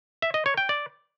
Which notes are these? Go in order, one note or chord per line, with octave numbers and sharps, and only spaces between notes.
E5
D#5
C#5
G5
D5